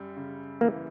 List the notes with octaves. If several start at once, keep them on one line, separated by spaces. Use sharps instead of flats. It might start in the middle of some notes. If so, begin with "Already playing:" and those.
Already playing: F#2 G3
C#3
E3 A#3